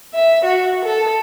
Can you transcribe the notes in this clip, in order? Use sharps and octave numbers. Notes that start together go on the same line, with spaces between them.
E5
F#4
A4